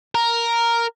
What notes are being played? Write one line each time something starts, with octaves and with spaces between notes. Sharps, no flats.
A#4